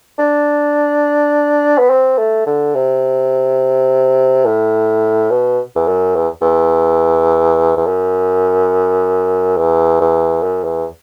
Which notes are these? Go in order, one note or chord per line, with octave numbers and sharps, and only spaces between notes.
D4
B3
C4
A3
D3
C3
A2
B2
E2
F#2
E2
E2
E2
F#2
E2
E2
F#2
E2